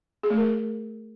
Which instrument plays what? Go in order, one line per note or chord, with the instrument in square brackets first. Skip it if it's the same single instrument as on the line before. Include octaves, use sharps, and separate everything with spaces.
[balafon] G#4
A3
A#4